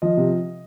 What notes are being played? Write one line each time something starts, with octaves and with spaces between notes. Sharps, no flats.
F3 D#5
C3